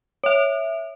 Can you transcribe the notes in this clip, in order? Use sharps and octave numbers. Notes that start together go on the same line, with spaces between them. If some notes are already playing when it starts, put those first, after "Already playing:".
C#5 E5